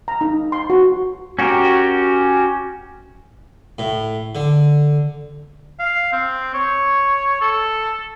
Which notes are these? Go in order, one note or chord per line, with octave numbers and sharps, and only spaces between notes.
A#5
D#4
C6
F#4
C#4 F#4 G4 A#4
A2
D3
F5
C4
C#5
A4